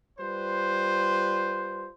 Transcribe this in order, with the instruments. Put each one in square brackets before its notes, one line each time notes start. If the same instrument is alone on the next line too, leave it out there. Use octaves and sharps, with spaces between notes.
[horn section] G3 F4 B4 C5